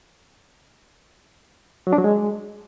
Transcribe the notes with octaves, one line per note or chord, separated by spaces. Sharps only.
F#3
D4
F#3
G#3